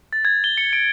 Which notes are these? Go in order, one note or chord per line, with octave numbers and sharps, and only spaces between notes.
A6
G#6
G7
C#7
D7